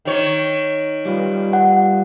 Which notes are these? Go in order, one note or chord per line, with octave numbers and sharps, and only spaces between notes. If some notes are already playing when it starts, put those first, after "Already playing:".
D#3 C#5
G3 F4 B4
F#5